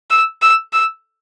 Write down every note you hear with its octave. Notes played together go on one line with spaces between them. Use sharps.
E6
E6
E6